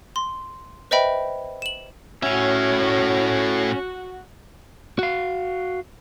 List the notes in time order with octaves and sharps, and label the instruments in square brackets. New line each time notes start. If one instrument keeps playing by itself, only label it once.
[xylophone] C6
B4 C5 D#5 E5 G5 B5
E7 F#7
[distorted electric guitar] A2 E5 [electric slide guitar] C#4 [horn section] F#4
[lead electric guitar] F#4 F5